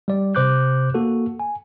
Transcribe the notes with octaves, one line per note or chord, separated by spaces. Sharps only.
G3 D5
C3 C5 D6 F#6 G6
A#3 F#4 A4
G#5